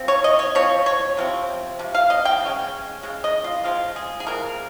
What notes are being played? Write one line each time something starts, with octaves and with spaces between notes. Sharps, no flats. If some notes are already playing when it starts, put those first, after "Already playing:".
Already playing: F3 C4
C#5
D#5
C#5
F3 C4 C#5
C#5
C3 F3 C4
C3 F3
F5
D#5
G5
C#3 G#3 C#4
C#3 G#3
D#5
F4
F3 G#3 C4 F4
G#4
G#4
F3 G#3 C4 A#4